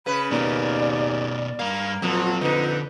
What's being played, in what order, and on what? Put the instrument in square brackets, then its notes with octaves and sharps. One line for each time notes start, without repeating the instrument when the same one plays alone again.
[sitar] C#3 B4 [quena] B5
[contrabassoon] D#2 [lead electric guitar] B2 A#4 [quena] D5
[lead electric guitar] G2 F5 [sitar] A#3
[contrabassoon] F2 [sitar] A#2 F3 [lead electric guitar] F#3
[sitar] A#2 D#4 [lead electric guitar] D3 [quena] B4